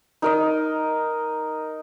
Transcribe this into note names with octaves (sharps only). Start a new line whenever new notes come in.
D#4 A#4 D#5